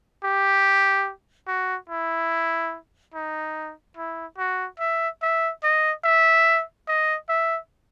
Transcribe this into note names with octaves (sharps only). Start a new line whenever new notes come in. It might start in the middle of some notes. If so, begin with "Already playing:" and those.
G4
F#4
E4
D#4
E4
F#4
E5
E5
D#5
E5
D#5
E5